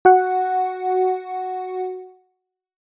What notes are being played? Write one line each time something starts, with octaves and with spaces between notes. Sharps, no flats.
F#4 F#5